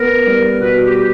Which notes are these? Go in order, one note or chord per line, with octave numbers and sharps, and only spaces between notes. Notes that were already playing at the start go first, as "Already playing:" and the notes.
Already playing: B3 A#4
G3
B2 B4
G4